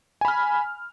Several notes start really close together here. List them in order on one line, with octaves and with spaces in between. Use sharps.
G#5 B5 F6